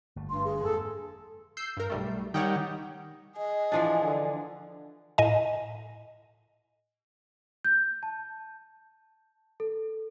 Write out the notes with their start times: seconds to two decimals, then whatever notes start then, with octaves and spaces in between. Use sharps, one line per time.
0.16 G1 A3
0.30 G2 C6
0.44 G#4
0.64 F2 G#2 A#3 A4
1.57 E6 G6 C7
1.77 G2 A#4
1.90 B1 G3 A3
2.34 D#3 G3 C#5 F#5 G5
3.37 G#4 D#5
3.72 E3 F3 D4
4.03 D3
5.18 A2 D#5 G#5
7.65 G6
8.03 A5
9.60 A4